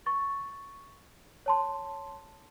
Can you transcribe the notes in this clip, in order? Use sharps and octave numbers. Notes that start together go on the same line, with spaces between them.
C#6 A6
C#5 A5 C6